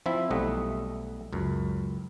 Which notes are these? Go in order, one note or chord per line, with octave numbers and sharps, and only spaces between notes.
F3 C4 E4 E5
B1 G3 A3 D#5 F#5
C#2 F#2